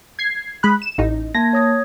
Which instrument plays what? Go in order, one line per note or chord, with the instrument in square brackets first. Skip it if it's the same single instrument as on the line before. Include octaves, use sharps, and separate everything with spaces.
[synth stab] G#6 C7
G#3 B5 F#6
E7
A1 D#4
[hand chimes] A#3 A5 G#6 [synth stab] A#6
[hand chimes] C#5 D#6 G#6